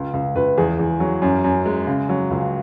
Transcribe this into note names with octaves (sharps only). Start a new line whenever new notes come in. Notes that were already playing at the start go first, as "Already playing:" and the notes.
Already playing: C#2
C#2
C#2 B4
E2 G#4
E2
F#3
F#2
F#2
G#3
C#3
F#3
C#2